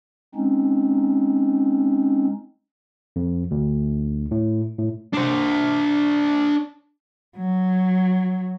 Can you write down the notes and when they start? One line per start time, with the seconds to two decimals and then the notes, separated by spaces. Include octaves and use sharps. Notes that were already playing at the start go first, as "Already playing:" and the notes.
0.35 G#3 C4 C#4 D#4
3.16 F2
3.51 D2
4.31 A2
4.79 A2
5.13 D4 C5
7.37 F#3